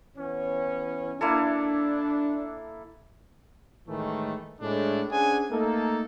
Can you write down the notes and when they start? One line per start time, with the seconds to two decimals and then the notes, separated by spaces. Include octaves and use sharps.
0.17 E3 B3 C#4
1.21 A#3 D4 E4 A4
3.87 A2 D#3 E3 G#3 A3
4.61 A2 G#3 D4
5.11 C#4 D4 G#4 C5 F#5 G#5
5.51 A3 A#3 D#4 A4